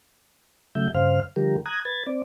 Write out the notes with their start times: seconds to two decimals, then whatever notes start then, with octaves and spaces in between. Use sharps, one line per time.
0.75 C#3 F#3 A3 E5 G6
0.95 G2 C#3 C5 F5 F6
1.36 D3 F3 G3 G4 A#4
1.66 A#5 D#6 F#6 G#6
1.85 B4 G#6 A6
2.07 C4 D5